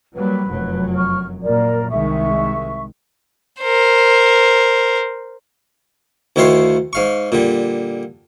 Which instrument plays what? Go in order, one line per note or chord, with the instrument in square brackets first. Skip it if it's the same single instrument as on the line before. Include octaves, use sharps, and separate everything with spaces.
[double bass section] F#3 G3 A#3 [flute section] B4
[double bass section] F1 F#2 F#3
[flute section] C#6 F6
[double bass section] F#2 A#2 A#3 [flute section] A#4 D5
[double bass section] C2 D#3 G#3 [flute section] E5 C#6
[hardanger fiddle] A#4 C5
[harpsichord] D2 D#3 E4 C#5 F5 C6
G#2 F5 C#6
A#2 D3 G3